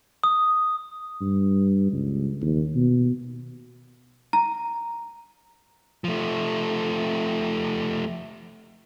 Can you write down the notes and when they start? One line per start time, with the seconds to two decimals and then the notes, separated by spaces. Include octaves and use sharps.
0.24 D#6
1.21 G2
1.92 C#2
2.42 D#2
2.75 B2
4.33 A#5
6.04 F3 A3